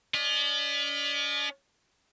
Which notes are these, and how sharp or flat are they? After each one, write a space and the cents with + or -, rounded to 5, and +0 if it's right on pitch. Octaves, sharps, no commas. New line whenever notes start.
C#4 +45 D#5 -40